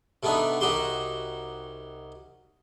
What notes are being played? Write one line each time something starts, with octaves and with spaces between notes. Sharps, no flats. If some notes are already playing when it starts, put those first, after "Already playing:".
C3 A3 B3 D4 D#4
C2 D#4 F#4 G4 C6